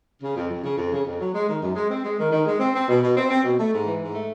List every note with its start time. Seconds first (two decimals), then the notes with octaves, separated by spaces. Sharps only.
0.22 C#3
0.35 F2
0.50 F2
0.64 C#3
0.77 F2
0.92 C#3
1.05 F2
1.19 F#3
1.34 G#3
1.47 D#3
1.62 F#2
1.75 G#3
1.89 C4
2.03 G#3
2.18 D#3
2.31 D#3
2.46 G#3
2.59 C4
2.74 C4
2.88 B2
3.02 B2
3.16 C4
3.30 C4
3.43 B2
3.58 A3
3.72 G#2
3.85 E3
4.00 G#2
4.13 A3